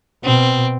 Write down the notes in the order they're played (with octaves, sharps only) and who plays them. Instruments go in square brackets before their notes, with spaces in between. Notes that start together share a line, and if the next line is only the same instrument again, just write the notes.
[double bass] B2 [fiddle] C4